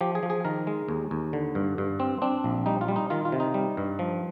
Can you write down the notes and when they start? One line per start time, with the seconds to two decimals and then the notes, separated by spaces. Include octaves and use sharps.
0.01 F3 G4
0.15 G#4
0.23 F3
0.30 G#4
0.45 D#3 A#4
0.67 G#3
0.88 D#2
1.11 D#2
1.33 D3
1.55 G2
1.78 G2
2.00 C4
2.22 C4 D4
2.44 A#1
2.66 G3 D#4
2.81 F4
2.88 G3
2.96 D#4
3.10 D#3 F4
3.25 F4
3.32 C3
3.40 D#4
3.54 G3
3.77 G2
3.99 F3